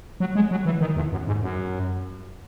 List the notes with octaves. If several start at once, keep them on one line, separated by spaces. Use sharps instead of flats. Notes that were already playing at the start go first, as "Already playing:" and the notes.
F#3
G#3
F#3
E3
D#3
E2
F#2
G#2
F#2